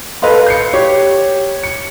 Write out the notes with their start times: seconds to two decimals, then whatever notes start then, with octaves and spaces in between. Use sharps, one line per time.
0.22 A4 B4 D#5 F5 C6
0.46 G6 C7 C#7
0.73 G4 C#5
1.63 C#7